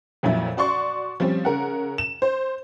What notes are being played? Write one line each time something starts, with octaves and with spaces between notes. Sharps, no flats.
F2 A#2 F#3 E4
F#4 D5 C6 C#6
F3 G3 C4 C#4
C#3 A#4 F#5
E7
C5